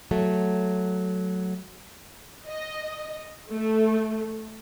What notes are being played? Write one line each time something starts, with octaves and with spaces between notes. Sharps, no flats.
F#3 A3
D#5
A3